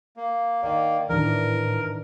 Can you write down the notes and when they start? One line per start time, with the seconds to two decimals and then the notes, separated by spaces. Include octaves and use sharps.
0.17 A#3
0.63 D#3 A#3 D5
1.09 A2 D#3 E3 D4 A#4